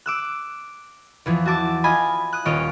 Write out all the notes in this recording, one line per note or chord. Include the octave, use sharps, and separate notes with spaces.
D6 E6 F#6
E2 E3 F3
F#4 E5 A5 D6
F4 D#5 G#5 B5
D#6 F#6
D#1 F4 C#5 D#5 D7